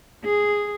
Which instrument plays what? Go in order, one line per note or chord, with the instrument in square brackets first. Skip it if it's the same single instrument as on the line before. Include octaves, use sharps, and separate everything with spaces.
[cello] G#4